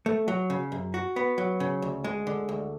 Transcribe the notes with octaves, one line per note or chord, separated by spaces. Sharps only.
A3
F#3
C#3
F#2
F#4
B3
F#3
C#3
D2
G#3
D3
D2